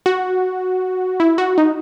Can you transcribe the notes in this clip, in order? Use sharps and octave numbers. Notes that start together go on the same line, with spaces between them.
F#4
E4
F#4
D#4